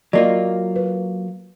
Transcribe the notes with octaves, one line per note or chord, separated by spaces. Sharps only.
F#3 A#3 F4 D5 D#5
B4